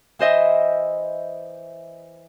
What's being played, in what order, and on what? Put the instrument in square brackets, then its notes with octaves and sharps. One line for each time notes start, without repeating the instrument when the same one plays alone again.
[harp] E3 C5 D#5 E5